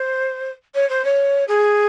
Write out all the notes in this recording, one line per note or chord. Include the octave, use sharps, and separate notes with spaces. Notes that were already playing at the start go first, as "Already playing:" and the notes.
Already playing: C5
C#5
C5
C#5
G#4